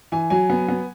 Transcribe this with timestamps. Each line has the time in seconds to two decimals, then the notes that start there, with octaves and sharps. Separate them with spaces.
0.12 E3 G#5
0.30 F#3 G#5
0.50 B3
0.68 B3